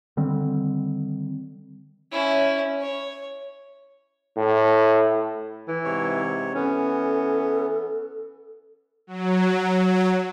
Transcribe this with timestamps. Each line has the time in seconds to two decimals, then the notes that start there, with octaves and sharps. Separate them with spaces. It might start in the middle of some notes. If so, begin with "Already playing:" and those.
0.17 D3 D#3 G3 C4
2.12 C#4 E4
2.80 C#5
4.37 A2
5.68 E3
5.84 G#2 C3 C#5
6.55 E3 B3 C#4 A4
9.07 F#3